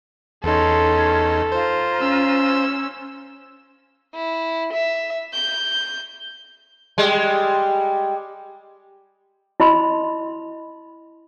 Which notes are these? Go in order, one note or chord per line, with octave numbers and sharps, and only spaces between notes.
E2 C#4 D#4 A4 C6
F4 C5 A#5
C#4 E6
E4
E5
G6
G3 G#3
E4 D#5 B5 C6